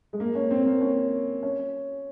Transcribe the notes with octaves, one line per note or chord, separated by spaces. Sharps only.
G#3
A#3
C#4
C4
A#3
C#4
C#4